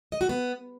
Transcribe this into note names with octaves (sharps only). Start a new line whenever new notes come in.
D#5
F#4
B3